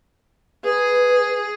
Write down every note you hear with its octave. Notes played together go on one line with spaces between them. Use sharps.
G#4 B4